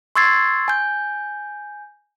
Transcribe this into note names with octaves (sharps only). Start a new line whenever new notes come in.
C6 C#6 E6 G#6 A6 C7
G#5 G6